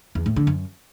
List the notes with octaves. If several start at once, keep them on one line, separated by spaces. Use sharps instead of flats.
E2
A2
D3
F#2